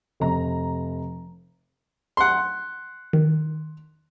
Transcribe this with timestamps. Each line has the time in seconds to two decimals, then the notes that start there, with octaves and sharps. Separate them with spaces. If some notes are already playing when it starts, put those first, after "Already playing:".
0.20 F1 A#5
2.17 F#5 C6
3.13 D#3